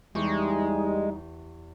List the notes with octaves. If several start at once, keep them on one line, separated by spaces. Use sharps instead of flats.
E2 G3 G#3 D#4 G4 C#6